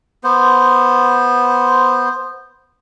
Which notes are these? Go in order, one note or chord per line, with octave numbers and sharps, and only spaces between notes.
B3 C5